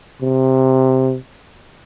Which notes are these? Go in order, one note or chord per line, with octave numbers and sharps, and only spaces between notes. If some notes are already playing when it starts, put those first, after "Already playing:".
C3